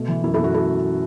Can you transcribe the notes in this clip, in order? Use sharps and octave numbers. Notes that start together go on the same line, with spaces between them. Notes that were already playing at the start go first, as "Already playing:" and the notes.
Already playing: B2 A3
E3
F#2 E4
E4 A4
F#2 F#4
A3 E4 A4